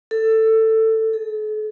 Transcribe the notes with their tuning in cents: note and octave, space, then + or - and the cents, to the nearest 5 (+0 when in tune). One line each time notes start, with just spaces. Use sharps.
A4 +15
A4 -45